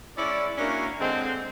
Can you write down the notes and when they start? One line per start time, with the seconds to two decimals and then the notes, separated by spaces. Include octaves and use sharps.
0.16 G#3 C#4 E4 D5
0.58 A#3 C#4 D4 E4 F#4 A#4
1.00 D3 G#3 C4